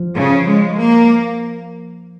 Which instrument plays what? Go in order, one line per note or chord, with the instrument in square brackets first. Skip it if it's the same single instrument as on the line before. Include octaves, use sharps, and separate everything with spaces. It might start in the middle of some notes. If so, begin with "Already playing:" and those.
Already playing: [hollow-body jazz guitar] F3
[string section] C#3
G#3
A#3